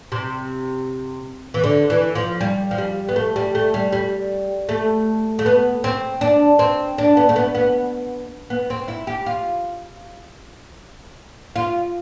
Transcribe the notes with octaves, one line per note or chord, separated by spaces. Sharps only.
C3
E3
D3
E3
F3
G3
F3
G3
B3
A3
G3
A3
G3
G3
A3
A3
B3
C4
D4
C4
D4
B3
A3
B3
B3
B3
C4
E4
G4
F4
F4